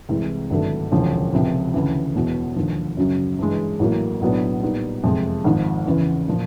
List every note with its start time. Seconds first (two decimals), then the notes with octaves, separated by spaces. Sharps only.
0.09 C2 C3 E3 G#3
0.50 G#1 G2 D3 F#3 A3
0.92 E1 D2 C#3 F3
1.33 C#2 C3 F3
1.74 D2 C#3 E3
2.15 E1 E2 B2
2.56 E1 D#2 D3 F3
2.97 F#2 C#3 F#3
3.39 G2 E3 G#3
3.79 A1 A2 F#3 A#3
4.21 B1 A2 F#3 B3 D4
4.62 A#2 G3 B3 D#4
5.04 F#1 F2 C3 F3 G#3
5.44 G#1 G#2 F3
5.86 E2 C#3 E3
6.28 A#2 F3